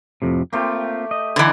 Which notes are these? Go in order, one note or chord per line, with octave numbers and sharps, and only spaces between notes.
F2 A2 C3
A3 A#3 C4 F4 G4
D#5
D3 E3 B3 D4 D#4